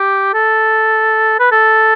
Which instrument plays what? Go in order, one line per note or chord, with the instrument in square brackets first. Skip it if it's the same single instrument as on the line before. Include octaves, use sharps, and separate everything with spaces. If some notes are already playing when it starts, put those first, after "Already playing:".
Already playing: [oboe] G4
A4
B4
A4